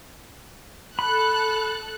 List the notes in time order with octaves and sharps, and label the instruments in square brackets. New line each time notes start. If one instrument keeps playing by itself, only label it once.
[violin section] A4 F#6 [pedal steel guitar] B5